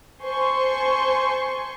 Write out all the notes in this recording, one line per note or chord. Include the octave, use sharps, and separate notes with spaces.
C5 G#5 A5 C6 C#6